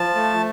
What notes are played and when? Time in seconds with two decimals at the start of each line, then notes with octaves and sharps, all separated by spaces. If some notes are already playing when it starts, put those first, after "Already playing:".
Already playing: F3 A5
0.15 A3